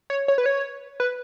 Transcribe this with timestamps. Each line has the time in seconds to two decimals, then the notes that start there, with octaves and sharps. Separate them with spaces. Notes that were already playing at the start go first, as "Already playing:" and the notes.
0.10 C#5
0.28 C#5
0.38 B4
0.46 C#5
1.00 B4